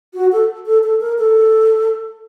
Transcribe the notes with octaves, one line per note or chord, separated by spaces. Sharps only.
F#4
A4
A4
A4
A#4
A4